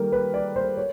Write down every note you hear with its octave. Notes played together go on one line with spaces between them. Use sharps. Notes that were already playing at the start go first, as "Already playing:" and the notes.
Already playing: D#3 G3 A#3 G4 A4 A#4
B4
D5
C5
C#5